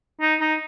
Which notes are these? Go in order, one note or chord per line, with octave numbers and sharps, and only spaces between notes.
D#4
D#4